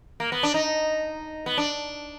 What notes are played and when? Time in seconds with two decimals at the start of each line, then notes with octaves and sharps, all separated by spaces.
0.20 A#3
0.32 B3
0.43 D4
0.54 D#4
1.46 B3
1.58 D4